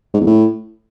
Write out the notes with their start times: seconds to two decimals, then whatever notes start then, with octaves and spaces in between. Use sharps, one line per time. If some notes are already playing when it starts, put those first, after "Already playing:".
0.14 G#2
0.20 E2
0.27 A2